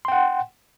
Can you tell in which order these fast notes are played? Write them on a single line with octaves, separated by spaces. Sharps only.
C6 G5 F#5